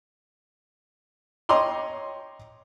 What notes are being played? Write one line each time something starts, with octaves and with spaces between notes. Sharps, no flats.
C#5 D#5 G5 A#5 C6 D6